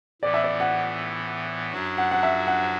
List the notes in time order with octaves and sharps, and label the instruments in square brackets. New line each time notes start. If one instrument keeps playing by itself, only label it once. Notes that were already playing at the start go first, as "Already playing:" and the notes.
[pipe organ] A2 E3 B3 [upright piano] D5
[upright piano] E5
D5
F#5
[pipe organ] F#2 F#3 D4 F#4
[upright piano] F#5
F#5
E5
F#5